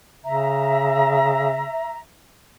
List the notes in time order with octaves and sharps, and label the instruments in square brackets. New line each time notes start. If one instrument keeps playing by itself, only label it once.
[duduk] C#3 [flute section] E5 A#5